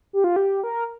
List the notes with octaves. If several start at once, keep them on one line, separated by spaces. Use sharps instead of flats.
G4
F4
G4
A#4